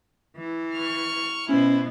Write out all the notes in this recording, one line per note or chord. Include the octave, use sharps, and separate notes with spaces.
E3
C#6 F6
B2 B3 C#4 E4 C5